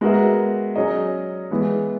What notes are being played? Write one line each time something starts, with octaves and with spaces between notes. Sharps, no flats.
G#3 B3 F#4 A#4 E5
F#3 C#4 G#4 D#5
E3 G#3 B3